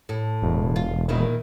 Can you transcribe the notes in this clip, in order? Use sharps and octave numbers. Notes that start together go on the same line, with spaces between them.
A2
E1
F4
A#2 D#3 E4